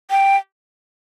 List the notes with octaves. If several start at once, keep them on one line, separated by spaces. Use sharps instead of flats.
G5